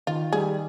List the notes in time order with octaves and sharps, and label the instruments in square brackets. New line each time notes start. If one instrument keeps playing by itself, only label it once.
[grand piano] D#3 [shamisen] F4
[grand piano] G3 [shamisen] G#4